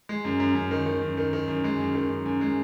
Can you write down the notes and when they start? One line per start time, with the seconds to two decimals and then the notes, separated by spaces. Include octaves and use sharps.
0.09 G#3
0.25 F#2
0.40 F#2
0.55 F#2
0.71 D#3
0.86 D#3
1.02 F#2
1.17 D#3
1.33 D#3
1.48 F#2
1.64 G#3
1.79 F#2
1.95 D#3
2.10 F#2
2.26 F#2
2.41 G#3